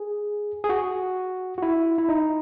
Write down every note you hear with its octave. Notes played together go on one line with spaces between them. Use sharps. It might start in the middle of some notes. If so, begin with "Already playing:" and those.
Already playing: G#4
G#4
F#4
F#4
E4
E4
D#4